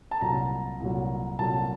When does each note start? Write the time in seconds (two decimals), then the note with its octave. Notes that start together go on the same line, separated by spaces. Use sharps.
0.11 A5
0.21 C2 A#2 F#3 A#5
0.80 C2 A#2 F#3
1.39 C2 A#2 F#3 A5